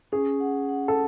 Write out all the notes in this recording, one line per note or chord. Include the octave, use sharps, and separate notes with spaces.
C#4 G#4
F#5
F#5
A4